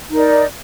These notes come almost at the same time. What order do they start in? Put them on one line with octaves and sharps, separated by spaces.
D#4 A#4 D5